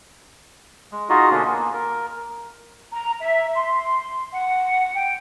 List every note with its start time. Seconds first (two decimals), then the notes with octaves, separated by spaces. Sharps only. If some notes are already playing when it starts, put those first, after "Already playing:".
0.92 G#3
1.09 D#4 F4 F#4 G#4 D#5
1.31 B2 D3 A#3 C#4 D4 F4
1.45 A#3
1.74 A#4
2.92 A#5
3.20 E5
3.55 C6
4.32 F#5
4.95 G5